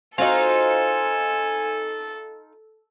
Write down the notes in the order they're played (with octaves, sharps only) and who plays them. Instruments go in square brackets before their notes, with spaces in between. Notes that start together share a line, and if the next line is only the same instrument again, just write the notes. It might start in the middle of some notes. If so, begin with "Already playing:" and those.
[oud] C4 F#4 [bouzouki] D#4 F4 [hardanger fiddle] A4 [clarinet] G#5